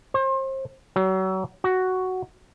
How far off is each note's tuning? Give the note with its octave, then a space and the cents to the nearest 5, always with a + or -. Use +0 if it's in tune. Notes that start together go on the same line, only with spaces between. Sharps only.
C5 +35
F#3 +35
F#4 +5